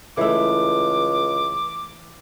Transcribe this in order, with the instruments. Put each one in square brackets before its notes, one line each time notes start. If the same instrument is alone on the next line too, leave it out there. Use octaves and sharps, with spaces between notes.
[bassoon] C#2 [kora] E3 A3 [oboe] D6